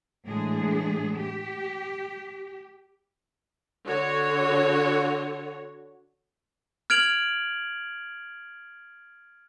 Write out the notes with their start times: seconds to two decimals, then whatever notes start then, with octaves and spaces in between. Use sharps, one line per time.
0.26 A2 E3 G#3 D4 G#4
1.16 G4
3.85 D3 F#4 C#5
6.90 F6 G#6 D7 F7 F#7